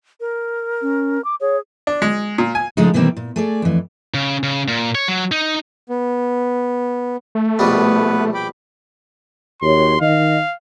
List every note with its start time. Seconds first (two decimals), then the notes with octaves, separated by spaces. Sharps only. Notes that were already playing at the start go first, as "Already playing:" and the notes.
0.20 A#4
0.82 C#4
1.25 D6
1.41 G#4 C#5
1.87 D4
2.02 G#3
2.38 A#2
2.55 G#5
2.77 C#3 F3 G#3 A3 D4 D#4
2.94 B2 D#3 E3 G3 A#3 C4
3.17 A#2
3.36 A3 G#4 D5
3.62 F2 E3
4.14 C#3
4.43 C#3
4.68 A#2
4.95 C#5
5.08 F#3
5.32 D#4
5.89 B3
7.35 A3
7.59 A#1 B2 G3 B3 B4
8.34 G5 B5 D6
9.62 D#2 F#4 G4 C#5 C6
10.01 D#3 D#5 F5